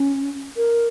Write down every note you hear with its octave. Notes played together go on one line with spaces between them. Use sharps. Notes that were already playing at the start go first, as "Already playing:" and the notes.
Already playing: C#4
A#4